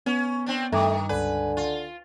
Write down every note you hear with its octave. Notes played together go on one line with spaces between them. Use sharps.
B3 C#4
C4 D4
G2 D#3 A3 A#5 D6 D#6
C#2 D3 B4 G#5
F4